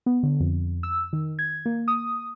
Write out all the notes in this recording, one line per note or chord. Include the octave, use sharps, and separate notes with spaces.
B3
D3
F2
E6
D#3
G#6
A#3
D#6